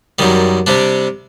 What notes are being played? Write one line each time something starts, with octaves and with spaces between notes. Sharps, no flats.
F#2 D#3 G3
C3 G3 D4